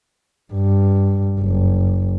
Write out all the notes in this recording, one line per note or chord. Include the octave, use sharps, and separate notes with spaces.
G2
F#1